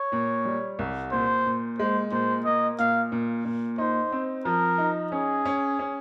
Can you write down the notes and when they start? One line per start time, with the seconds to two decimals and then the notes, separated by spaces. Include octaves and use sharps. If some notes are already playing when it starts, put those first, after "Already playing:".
Already playing: C#5
0.12 A#2
0.45 G3
0.79 C2
1.12 A#2 C5
1.46 A#2
1.79 G#3 C5
2.12 A#2 C5
2.45 A#3 D#5
2.79 A#2 F5
3.12 A#2
3.45 A#2
3.78 D#4 C5
4.12 C4
4.45 F3 A#4
4.78 D#4
5.12 C#4 G#4
5.46 C#4
5.79 C#4